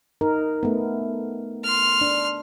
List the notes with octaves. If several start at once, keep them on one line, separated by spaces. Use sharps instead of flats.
D#4 A#4
A3 B3
C6 F6
D4